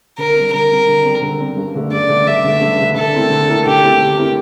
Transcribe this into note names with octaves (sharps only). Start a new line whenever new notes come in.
D3 A#4
G3 C4
D3 A#4
G3 C4
D3
G3 C4
D3
G3 C4
G2
D3 A3
G2 D5
D3 A3
G2 E5
D3 A3
G2
D3 A3
D3 A4
A3 C4 E4 A#4
D3
A3 C4 E4 A#4
D3 G4
A3 C4 E4 A#4
D3
A3 C4 E4 A#4